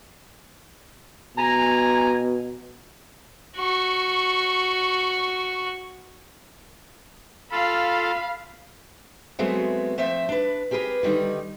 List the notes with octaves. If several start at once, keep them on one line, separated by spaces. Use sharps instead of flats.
B2 G#5 A#5
F#4 C#6
F4 A4 F5 B5
F#3 G#3 A3 B3 C4 F#4
F3 A3 C4 C5 E5
D4 B4
C4 G4 G#4 A#4 B4
D3 D#3 G3 D#4